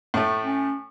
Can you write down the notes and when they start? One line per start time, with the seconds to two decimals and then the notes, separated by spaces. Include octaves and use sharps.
0.14 A2 A3
0.44 C#4